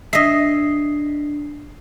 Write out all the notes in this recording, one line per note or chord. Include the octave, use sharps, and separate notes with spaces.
D4 D#5 E5 C7